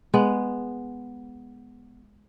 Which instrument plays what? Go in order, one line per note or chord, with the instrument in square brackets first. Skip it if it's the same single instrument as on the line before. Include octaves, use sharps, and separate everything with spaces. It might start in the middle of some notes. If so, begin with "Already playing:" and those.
[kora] G#3 B3